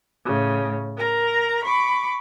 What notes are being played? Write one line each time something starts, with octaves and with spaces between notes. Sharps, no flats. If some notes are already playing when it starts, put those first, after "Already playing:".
A2 C#3
A#4 A#5
B5 C#6 D6